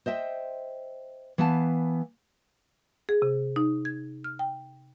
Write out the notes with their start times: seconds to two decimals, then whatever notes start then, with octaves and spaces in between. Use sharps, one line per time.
0.06 C5 D#5 E5 G5
1.38 E3 B3 F5 A5
3.09 G#4
3.22 C3
3.56 D#4
3.85 G#6
4.24 F6
4.39 G5